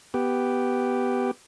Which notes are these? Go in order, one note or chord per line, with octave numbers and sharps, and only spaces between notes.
B3 G4